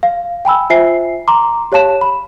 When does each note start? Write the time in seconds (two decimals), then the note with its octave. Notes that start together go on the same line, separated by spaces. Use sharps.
0.03 F5
0.45 G5 G#5 B5 E6
0.70 F4 C5 E5 G#5 C7
1.28 A#5 C6 D6
1.72 G4 C#5 F5 A5 E7
2.01 B5